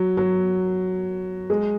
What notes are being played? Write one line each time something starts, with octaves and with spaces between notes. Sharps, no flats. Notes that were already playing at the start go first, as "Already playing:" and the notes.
Already playing: F#3
F#3
G#3